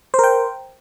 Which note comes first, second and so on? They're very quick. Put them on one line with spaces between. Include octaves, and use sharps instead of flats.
C5 A#4 G5